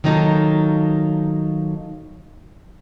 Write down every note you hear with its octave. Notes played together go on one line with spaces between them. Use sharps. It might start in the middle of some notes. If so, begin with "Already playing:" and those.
D#3 F#3 A#3 D#4 F4 A4